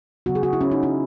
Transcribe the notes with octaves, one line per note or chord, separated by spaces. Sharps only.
C#3 F#3 B3 F#4
G#4
F#4
E4
C#4
D#4
E4